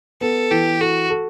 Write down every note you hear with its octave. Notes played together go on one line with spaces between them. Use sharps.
B3 A4
E3 G4
F#4 A4
A4